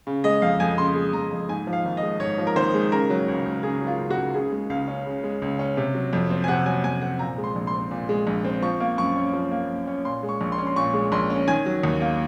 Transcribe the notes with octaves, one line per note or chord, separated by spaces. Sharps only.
C#3
G#3 D#5
F2 F5
F2 G#5
C#3 C6
G#3
F2 A#5
F2
G#2 G#5
F3
F5
G#1
D#5
G#3
G#2 C#5
F3
A#4
G#1 C5
G#3
C#3 A#4
F#3
C#2
C#2
C#3 G#4
F#3
F4
C#2
F#4
C#2
C#3 G#4
G#3
C#2 F5
C#4
C#3
G#3
C#2
C#4
C3
F#3
F2
C4
G#5
C3 F#5
F#3 G#5
F2 G#5
C4 F#5
A#2 A#5
G#3
C6
A#1
C6
C4
A#2
G#3
A#1
C4
F3 C#6
A#3
F#2 C#6
C#4
F3
A#3
F#2
C#4
A#2 C6
G#3
C#6
A#1
C6
C#4
C6
A#2 C#6
G#3
A#1 C6
C#4
D#3 G#5
F#3
D#2
A#3